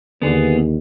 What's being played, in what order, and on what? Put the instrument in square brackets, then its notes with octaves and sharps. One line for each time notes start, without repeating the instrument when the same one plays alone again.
[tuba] D#2 [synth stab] D3 [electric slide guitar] B3 G#4